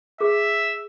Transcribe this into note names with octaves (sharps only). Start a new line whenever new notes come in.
G#4 E5